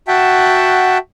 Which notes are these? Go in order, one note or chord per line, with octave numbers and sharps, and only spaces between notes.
F#4 E5 F#5 G5 A5